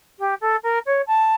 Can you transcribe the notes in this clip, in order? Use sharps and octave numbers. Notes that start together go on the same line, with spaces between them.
G4
A4
A#4
C#5
A5